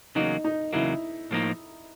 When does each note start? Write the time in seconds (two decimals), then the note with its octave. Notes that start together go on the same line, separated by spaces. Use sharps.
0.15 E2 C#3 F#3 A#3 D#4
0.44 D#4
0.73 E2 C#3 F#3 A#3 E4
1.31 A2 F3 A#3 D#4